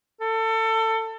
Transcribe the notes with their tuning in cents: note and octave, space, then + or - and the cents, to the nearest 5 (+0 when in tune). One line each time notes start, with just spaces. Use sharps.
A4 +25